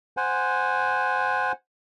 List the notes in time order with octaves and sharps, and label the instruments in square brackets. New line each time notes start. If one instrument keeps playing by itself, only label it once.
[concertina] C5 F#5 G#5